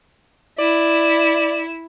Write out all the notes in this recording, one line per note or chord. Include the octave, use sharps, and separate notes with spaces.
E4 D5 E7